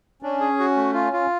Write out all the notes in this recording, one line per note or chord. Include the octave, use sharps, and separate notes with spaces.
C#4 D4
G#4
F#4
A3
F4
F4